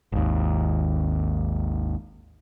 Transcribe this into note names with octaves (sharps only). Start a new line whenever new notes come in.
G#1 D#2